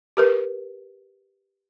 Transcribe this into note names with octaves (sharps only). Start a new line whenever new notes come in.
G4 A#4 B4